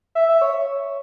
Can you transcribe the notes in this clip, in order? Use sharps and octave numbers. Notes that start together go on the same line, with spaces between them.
E5
E5
C#5